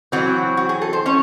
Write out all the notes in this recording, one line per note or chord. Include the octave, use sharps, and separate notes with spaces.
E3 F#3 C4 F#4
F#4
G#4
A4
C5
C#4 C#5